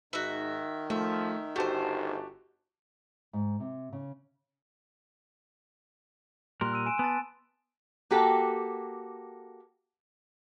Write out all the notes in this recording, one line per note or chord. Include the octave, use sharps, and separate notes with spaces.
G#2 D#3 F#4 E5
F3 A3 E5
G1 A3 F#4 G4 C5 A5
G#2
C3
C#3
A#2 G3 A#4 C6 F#6
E6 D#7
G#5 D7 E7
B3 G#5 A5 A6
A#3 F#4 G4 A4